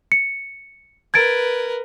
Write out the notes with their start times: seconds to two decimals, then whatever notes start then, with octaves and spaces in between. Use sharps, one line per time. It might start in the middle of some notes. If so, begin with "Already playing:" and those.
0.12 C#7
1.14 A#4 B4 G#6 A6 D7